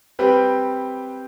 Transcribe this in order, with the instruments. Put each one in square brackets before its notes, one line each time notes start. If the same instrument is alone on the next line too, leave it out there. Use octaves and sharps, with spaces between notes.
[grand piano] G3 C4 G4 B4